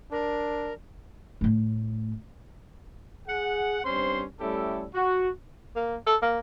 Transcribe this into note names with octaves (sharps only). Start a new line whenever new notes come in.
D4 A#4
A2 A3
G#4 F#5
G2 G3 C4 C#4 C5 C6
G3 A3 C#4 E4 G4 A4
F#4
A#3
A4
A#3